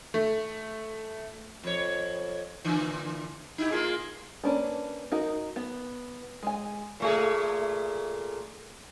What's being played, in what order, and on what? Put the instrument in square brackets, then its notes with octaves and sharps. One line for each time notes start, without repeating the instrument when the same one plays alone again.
[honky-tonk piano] A3
[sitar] F2 C#5
A#2 D3 E3
D#4 E4 G4
A#3 F4 G#4
[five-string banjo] A#3 C#4 D4 B4
D#4 F#4 A#4
B3
G#3 G#5
[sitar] A#2 A3 G#4